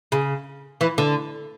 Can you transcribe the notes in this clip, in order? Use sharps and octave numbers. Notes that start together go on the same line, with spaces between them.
C#3
E3
D3